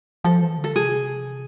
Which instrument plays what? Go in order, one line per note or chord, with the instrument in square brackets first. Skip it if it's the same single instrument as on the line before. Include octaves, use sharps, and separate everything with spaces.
[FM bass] F3 [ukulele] A4
[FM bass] E3
D3
[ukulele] A4
[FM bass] C3 [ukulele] G#4